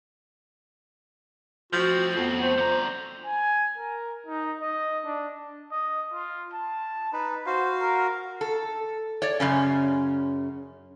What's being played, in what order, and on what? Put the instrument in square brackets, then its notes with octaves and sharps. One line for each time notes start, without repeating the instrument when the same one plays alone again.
[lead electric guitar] A2 C4 [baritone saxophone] F3 [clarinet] F#4
[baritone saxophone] F2 [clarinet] B3
[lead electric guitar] A3 [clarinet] C5
[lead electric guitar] D3 A#5
[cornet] G#5
A#4
D#4
D#5
D4
D#5
F4
A5
[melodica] D#4 [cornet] B4
[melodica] F#4 F5 [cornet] C5
[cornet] A#4
[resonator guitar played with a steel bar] A4
C#5 D5
F#2 C#3 C#4